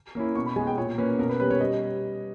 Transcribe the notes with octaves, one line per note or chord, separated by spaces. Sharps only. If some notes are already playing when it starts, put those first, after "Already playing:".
A#3 C#4 E4
B2 C#6
B5
G#3 B3 G#5
G5
A#2 C#5
A#3 C#4 B4
B2 A#4
B4
G3 C#4 B4
C#5
G3 D#5